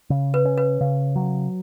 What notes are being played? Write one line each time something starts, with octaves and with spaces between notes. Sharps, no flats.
C#3
B4
C#4
B4
C#3
F#3